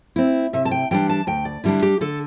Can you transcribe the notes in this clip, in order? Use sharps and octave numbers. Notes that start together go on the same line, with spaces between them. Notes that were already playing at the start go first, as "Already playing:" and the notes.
C4 E4
C3 E5
A5
G5
E3 G3 D4 G5
A5
D2 G5
D5
D3 G3 D4 E4
G4
D3 A4